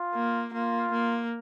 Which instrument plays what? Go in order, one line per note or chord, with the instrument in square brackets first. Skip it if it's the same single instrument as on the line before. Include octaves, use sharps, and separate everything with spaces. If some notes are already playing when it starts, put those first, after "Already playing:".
Already playing: [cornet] F4
[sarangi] A#3
[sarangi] A#3 [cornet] F4
[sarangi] A#3